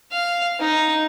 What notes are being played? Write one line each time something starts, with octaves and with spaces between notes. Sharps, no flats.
F5
D#4